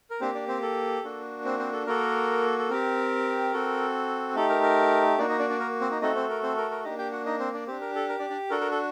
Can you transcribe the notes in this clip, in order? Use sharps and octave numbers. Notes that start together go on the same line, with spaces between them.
A#4
A#3 C4 D4 G4 C5
D4 D5
C4 C5
A4
A#3 D4 F#4
C4 C5
C4 C5
A4
A#3 F#4 A4 A#4
A4
C4 G4 A#4
C4 F#4 A4
A3 D#4 G4 A4
A#4
A#4
A#3 D4 D#4 F#4 D5
D#4 D#5
D4 D5
D4 D5
A#4
C4 C5
D#4 D#5
A3 C4 D#4 F#4 A4 D#5
C4 C5
A#4
C4 C5
A#4
A#4
A#3 D4 D#4 G4 D#5
G4 G5
F#4 F#5
D#4 D#5
C4 C5
D4 D5
C4 D4 G4 C5
A#4
A4
A#4
D4 D5
D4 D5
D4 F#4 A4 A#4
A#4
A4